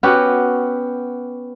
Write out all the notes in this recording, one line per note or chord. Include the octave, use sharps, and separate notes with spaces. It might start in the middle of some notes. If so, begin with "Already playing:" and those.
B3 C#4 F#4 G4